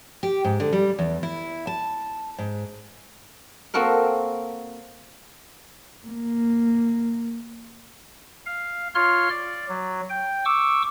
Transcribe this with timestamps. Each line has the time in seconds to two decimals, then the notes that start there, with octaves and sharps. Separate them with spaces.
0.23 G4
0.45 G#2
0.60 D3
0.73 G3
0.99 E2
1.23 E4
1.67 A5
2.38 G#2
3.74 A#3 C4 F#4 A4 A#4
6.07 A#3
8.46 F5
8.95 F4 C#5 C6 F6
9.30 D5
9.69 F#3
10.10 G5
10.45 C#6 D6 E6